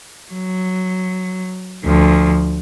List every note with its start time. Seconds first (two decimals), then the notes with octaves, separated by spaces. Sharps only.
0.32 F#3
1.84 D2 F3